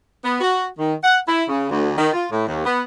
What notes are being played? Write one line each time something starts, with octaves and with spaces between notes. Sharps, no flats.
B3
F#4
D#3
F#5
E4
C#3
D2
D#3
F4
A2
D#2
B3